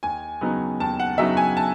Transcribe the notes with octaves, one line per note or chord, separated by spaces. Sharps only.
D#2 G#5
C#3 F#3 B3 D#4
D#2 A5
F#5
C#3 F#3 B3 D#4 E5
G#5
A5